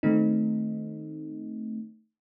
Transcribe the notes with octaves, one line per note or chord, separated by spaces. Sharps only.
D#3 A3 C4 D#4